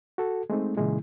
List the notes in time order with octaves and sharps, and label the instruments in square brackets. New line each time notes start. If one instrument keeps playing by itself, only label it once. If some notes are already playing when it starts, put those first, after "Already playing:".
[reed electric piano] F#4 A4
G#3 A3 C4 D#4
A#2 C#3 E3 G#3 E4